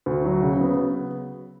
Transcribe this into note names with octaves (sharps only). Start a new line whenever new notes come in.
D2
F#3
C#3
B3